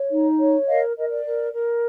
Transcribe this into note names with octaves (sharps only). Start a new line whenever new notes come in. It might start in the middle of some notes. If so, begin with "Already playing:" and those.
Already playing: C#5
D#4
C#5
A#4 D#5 F5
A#4 D#5
D5
A#4
A#4